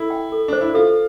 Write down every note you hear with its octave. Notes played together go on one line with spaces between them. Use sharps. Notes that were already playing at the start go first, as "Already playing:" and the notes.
Already playing: E4 A4
G5
A4
D4 C5
E4
F4 A4